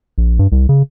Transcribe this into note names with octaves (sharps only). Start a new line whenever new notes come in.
A#1
G2
C2
C#3